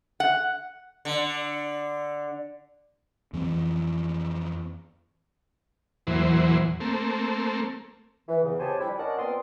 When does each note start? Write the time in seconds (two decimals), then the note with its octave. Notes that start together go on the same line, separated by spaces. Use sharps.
0.20 F#5
1.05 D3
3.33 F2 E3 C4
6.07 E2 A#2 E3 F#3 C5
6.80 A3 A#3 C4
8.28 E3
8.42 E2 C#3
8.58 B2 G4 C5 C#5 G#5 A5
8.78 F2 G3 D4 E4
8.97 C#4 A#4 D5 D#5 F#5 A5
9.17 A#2 B3 C4 D5 C6 D#6